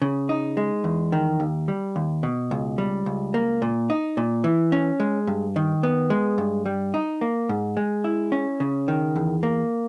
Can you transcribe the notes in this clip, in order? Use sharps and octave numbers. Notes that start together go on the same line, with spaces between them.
C#3
D#4
G#3
E2
D#3
D#2
G3
D#2
B2
C#2
G3
C#2
A#3
A#2
D#4
A#2
E3
C#4
G#3
G2
D#3
B3
G#3
G2
G3
D#4
A#3
G#2
G#3
E4
C#4
C#3
D#3
E2
A#3